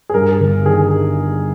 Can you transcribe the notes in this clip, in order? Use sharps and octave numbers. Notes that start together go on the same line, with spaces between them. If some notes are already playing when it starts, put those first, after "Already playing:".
G#4
G2 A#4
G1
D#3 G#4